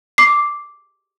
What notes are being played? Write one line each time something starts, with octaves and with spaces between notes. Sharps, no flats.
D6 C7